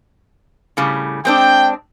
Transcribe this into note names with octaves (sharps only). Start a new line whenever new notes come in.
A2 C#3 G3
G#3 C4 D4 G5